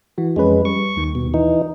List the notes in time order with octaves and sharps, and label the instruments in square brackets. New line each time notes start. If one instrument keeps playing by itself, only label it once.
[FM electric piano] E3 F#4
[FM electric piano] F2 C#4 B4 [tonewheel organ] G#3
[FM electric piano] G3 [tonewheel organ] C#6
[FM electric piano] D#2 D#3
[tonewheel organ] B2
E3 D#4